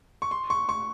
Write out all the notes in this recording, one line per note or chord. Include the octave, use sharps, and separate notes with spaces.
C#6
C6
C#6
C#6